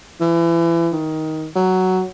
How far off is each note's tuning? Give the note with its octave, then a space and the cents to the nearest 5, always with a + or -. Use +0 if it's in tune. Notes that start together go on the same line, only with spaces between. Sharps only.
E3 +30
D#3 +15
F#3 +10